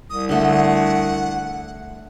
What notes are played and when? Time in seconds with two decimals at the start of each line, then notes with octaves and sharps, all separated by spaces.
0.10 C2 D#6
0.29 D3 A3 F#5